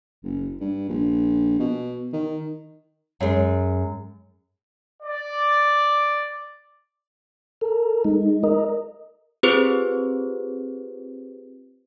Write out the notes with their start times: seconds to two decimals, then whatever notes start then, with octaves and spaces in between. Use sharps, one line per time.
0.23 F#1
0.60 G2
0.89 A#1
1.59 B2
2.13 D#3
3.20 F#2 G#3
5.03 D5
7.61 A4 A#4
8.05 G#3 D#4
8.44 A#4 D#5
9.43 C4 F4 G4 G#4 B4 C5